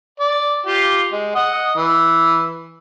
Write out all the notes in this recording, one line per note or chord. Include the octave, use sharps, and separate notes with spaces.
D5
F4 G4
G#3
D#5 F#5
E3